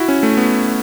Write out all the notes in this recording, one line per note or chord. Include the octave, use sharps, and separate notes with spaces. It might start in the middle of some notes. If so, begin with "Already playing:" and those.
Already playing: E4 F#4
C#4
A3
B3